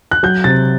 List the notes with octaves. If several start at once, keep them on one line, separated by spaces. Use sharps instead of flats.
F#6
F#3 G6
C3 A6